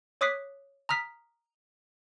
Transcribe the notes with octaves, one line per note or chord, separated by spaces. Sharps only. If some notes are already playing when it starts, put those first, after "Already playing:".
C#5 D6 D#6 F#6 B6 C7
A#5 D#6 F6 B6